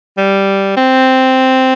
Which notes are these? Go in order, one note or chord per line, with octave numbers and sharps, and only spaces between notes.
G3
C4